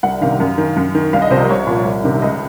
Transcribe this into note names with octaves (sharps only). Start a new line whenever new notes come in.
C2 F#5
C3 D#3 F5
F#2
D#3
F#2
D#3
C2 F5
D#5
C3 F3 C5
A#4
C2 C#5
A#2 F3
C2
C3 D#3
C#2 D#5